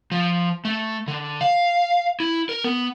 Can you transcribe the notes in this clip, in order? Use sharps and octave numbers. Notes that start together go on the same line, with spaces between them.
F3
A3
D3
F5
E4
A#4
B3